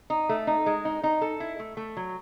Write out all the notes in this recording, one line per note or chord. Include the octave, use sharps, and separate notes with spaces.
D#4
A3
D#4
G#3
D#4
D#4
A4
E4
A3
A3
F#3